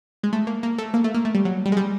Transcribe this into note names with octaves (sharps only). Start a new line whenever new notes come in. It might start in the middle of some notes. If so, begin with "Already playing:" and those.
G#3
A3
A#3
A#3
A3
A#3
A3
A#3
A3
G3
F#3
G3
G#3
G3